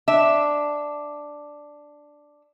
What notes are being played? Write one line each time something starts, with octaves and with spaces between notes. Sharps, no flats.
D4 E5